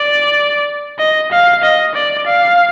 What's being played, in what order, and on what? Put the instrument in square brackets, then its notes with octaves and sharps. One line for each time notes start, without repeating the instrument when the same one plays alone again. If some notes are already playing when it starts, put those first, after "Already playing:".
Already playing: [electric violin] D5
D#5
F5
D#5
D5
F5